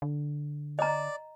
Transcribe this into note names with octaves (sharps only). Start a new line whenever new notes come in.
D3
D5 D#5 A#5